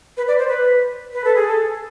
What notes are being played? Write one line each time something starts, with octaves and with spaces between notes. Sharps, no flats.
B4
D5
C5
B4
B4
A4
G#4
A4